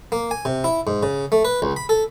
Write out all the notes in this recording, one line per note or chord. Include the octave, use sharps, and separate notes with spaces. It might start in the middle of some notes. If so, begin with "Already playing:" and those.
A#3
G#5
C3
E4
G#2
C#3
A3
B4
C#2
B5
A4